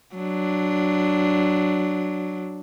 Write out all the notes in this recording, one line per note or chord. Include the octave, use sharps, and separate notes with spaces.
F#3 D4